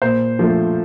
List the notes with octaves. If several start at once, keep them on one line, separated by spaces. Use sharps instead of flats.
A#2 C5
F3 A3